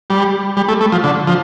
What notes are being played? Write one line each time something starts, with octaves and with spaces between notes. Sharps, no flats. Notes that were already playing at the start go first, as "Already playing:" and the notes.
G3
G3
A3
A3
F3
D3
F3